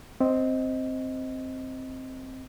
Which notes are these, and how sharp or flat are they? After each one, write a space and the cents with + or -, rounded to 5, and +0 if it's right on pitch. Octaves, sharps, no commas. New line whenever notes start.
C4 +0 D#5 +10